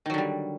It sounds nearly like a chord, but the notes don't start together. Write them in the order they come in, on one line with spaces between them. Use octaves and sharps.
D#3 F#3 D3 G3